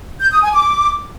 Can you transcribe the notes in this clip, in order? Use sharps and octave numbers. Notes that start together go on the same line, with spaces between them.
G6
D#6
G#5
D6